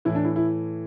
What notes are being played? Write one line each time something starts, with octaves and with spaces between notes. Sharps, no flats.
A2 E3 A3 E4
D4
E4
E4